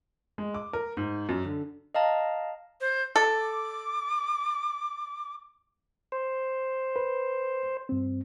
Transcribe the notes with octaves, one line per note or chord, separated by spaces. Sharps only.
G#3
D6
A#4
G#2
F#2
D3
D#5 F5 A5 A#5
C5
A4 D6
C5
B4
G2 C4